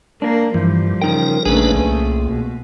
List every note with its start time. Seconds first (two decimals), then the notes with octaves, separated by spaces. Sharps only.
0.22 A#3 D4 A#4
0.54 G2 E3 F3 G3
1.02 C#3 D#4 A#4 G5
1.45 A#1 A#2 C#3 A3 D4 G#4 B4
1.76 C2
2.29 B2